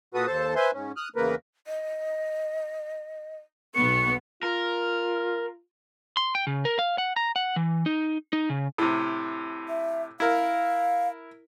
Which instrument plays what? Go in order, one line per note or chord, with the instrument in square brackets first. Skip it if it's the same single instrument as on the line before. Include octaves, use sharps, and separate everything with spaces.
[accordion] A#2 F#4 A4 B4 D#6
D#2 A4 C5 A5
B4 C5 E5 G#5 C6
G#2 C#4
D#6 F6 F#6
E2 C#3 A#3 A#4 B4
[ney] D#5
[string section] B1 B3 [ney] C#6 [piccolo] C#7
[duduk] F4 [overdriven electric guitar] A#4
[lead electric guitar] C6
G5
C#3
A#4
F5
F#5
A#5
F#5
E3
D#4
D#4
C#3
[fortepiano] A2 C3
[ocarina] E5
[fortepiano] E4 A#4 [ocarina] F5